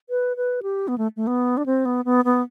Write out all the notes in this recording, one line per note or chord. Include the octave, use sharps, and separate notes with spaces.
B4
B4
G4
B3
A3
A3
B3
D4
C4
B3
B3
B3